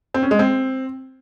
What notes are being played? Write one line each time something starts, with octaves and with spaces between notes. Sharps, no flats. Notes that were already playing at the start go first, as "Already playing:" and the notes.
C4
C#4
G#3
C4